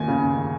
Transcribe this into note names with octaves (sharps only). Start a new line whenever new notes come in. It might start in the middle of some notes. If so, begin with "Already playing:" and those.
Already playing: D#2 G#5
C#3